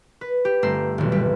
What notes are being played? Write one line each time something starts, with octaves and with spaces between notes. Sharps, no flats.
B4
G4
G1 A3 C4 A#5 E6 C7
D#1 B1
G1 G3 B4